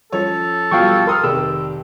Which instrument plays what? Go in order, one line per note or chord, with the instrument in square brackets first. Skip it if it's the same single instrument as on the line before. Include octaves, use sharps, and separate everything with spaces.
[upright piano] F3 C#4 C#5 [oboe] A4
[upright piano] B2 F3 G3 [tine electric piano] F5 G5 C#6
[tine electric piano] A#4 [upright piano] C6 D#6 F6
[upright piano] F1 D#3 G4 [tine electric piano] E6